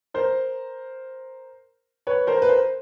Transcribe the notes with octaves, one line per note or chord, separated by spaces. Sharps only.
A#4 C5
B4 C#5
A#4 C5
B4
A#4 C5